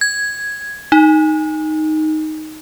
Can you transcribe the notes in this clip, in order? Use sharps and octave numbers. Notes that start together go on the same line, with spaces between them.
G#6
D#4